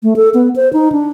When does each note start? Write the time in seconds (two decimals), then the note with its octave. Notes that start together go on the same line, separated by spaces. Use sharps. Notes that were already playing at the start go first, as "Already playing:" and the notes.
0.03 A3
0.16 A4
0.34 B3
0.56 C5
0.73 D#4
0.92 D4